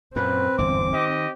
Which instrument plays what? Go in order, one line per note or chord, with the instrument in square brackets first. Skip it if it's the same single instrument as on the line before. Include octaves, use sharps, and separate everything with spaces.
[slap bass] F#2 A#2 [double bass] C4 [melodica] B4
[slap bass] G1 E2 G#2 [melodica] D6
[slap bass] D#3 [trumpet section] G4 D#5